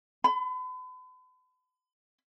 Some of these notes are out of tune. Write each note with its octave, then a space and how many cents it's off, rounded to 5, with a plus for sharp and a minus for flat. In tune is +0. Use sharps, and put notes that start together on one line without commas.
B5 +40